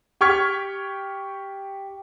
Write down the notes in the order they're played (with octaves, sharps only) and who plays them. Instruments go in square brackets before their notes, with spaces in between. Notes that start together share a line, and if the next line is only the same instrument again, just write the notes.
[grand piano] G4 G5 C#6 F6 G#6 B6